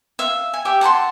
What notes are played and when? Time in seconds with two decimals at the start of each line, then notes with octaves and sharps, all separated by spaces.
0.19 E5 F5
0.54 G#5
0.65 G4 E5
0.81 F#5 A5 B5 C6